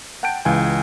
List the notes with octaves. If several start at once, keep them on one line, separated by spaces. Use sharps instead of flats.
F#5 G5 A5 G6 D7
C#2 E3 F5 G#5